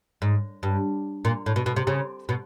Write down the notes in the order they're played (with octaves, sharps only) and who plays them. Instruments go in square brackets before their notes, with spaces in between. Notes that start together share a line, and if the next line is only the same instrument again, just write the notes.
[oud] G#2
G2
A#2
A2
B2
B2
C3
C#3
B2